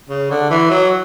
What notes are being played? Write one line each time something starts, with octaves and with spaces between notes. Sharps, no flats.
C#3
D3
E3
F#3